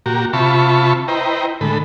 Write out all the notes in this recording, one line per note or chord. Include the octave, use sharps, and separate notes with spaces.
A#2 F#4 G4 A#5
C3 F4 E5 A5 B5 C#6
E4 B4 C5 D#5 G5 A#5
A2 D3 G#3 A4 B5